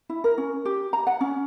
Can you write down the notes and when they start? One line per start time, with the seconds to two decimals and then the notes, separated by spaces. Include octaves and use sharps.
0.09 E4
0.24 A#4
0.38 C#4
0.65 G4
0.93 A#5
1.07 F#5
1.21 C#4